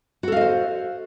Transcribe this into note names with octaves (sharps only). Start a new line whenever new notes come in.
F#4 A4 C5 D#5 F5